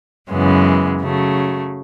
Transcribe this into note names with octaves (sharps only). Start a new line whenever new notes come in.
F#2 C#3 E3 G#3 B3
C#3 F#3 A3